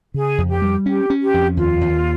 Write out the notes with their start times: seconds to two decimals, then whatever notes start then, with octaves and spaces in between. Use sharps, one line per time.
0.14 C#3 G#4
0.38 F2
0.50 G4
0.62 G3
0.85 C#4 G4
1.10 C#4
1.22 G4
1.34 F2
1.57 D#2 F4
1.81 D#2